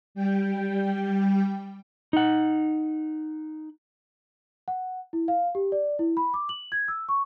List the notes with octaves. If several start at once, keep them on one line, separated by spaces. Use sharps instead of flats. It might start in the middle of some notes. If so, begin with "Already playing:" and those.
G3 G5
D#4 F#5
F#5
E4
F5
G4
D5
E4
B5
D6
F#7
G#6
E6
C#6